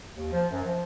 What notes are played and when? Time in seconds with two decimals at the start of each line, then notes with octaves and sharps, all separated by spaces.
0.16 D#2
0.32 F3
0.51 F#2
0.64 F3